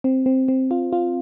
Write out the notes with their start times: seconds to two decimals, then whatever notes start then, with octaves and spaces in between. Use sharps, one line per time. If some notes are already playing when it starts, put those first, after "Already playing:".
0.04 C4
0.26 C4
0.48 C4
0.71 F4
0.93 F4